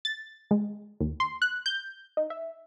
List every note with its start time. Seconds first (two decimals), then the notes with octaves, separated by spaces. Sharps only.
0.05 A6
0.51 G#3
1.00 D#2
1.20 C6
1.42 F#6
1.66 G6
2.17 D#4
2.30 E5